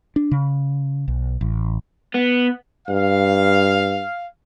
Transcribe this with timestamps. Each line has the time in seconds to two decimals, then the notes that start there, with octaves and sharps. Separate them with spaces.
0.16 D4
0.31 C#3
1.08 B1
1.41 A1
2.14 B3
2.88 G2 F5